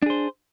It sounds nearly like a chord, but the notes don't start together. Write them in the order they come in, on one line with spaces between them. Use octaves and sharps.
D4 G#4 C5